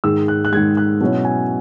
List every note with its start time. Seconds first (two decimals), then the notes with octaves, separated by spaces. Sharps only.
0.04 G#2 D#3 G#3 E6
0.28 F#6
0.45 F#6
0.52 G#2 D#3 G#3 G#6
0.77 F#6
1.01 B2 F#3 C#4 E4
1.25 G#5